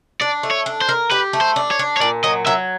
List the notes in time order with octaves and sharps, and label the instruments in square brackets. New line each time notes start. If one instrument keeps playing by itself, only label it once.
[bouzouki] D4 [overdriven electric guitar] D5
[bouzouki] A3
[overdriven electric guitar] C#5
[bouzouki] D4
[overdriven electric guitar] C5
[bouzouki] A#4
[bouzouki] G4 [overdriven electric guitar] B4
[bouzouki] A3
[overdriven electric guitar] C5
[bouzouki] D4
[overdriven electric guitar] C#5
[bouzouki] D4
[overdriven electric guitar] C#5
[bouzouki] A#2 [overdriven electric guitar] D5
[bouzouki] F#3 [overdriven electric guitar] D#5
[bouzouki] F#3 [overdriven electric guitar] E5